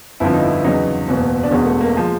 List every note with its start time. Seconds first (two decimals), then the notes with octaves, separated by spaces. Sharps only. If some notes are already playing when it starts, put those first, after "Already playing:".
0.20 G1 F2 D3 F3 E4
0.34 D#4
0.42 E4
0.64 E2 C#3 F#3 D#4
1.08 F#1 E2 B2
1.43 D4
1.51 E1 E2 B2 G#3 C#4
1.66 A3
1.81 A#3
1.97 F3 G#3